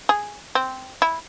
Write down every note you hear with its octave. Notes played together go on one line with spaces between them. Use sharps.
G#4
C4
E4